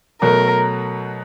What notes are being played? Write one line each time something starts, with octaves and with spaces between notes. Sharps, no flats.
B2 F#3 A3 A#4